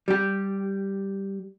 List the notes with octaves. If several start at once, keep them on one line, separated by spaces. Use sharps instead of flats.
G3 G4